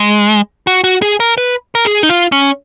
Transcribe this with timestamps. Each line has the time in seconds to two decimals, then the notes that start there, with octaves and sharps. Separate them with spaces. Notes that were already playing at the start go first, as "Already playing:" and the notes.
Already playing: G#3
0.67 F#4
0.84 F#4
1.02 G#4
1.20 A#4
1.38 B4
1.75 A#4
1.85 G#4
2.03 D#4
2.09 F4
2.32 C#4